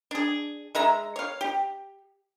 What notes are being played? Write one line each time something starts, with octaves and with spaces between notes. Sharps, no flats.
D4 G#4
G#3 E5 A#5
C#5 F5
G4